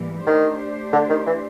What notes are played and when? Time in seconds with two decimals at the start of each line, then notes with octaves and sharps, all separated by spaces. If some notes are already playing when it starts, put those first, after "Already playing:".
Already playing: G#2 E3 G3 A#3
0.26 D#3 A3 D4 G4 C5
0.93 D3
1.10 D#3
1.26 E3